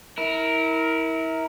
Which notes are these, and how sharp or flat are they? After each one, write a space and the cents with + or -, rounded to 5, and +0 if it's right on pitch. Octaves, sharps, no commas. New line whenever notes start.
E4 -30 A#4 +0